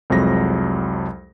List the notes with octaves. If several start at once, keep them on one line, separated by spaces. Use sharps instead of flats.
C2 F2 F#3 G#3 A#6